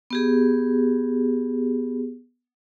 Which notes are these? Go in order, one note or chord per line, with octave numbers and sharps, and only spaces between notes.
B3 G4 G#4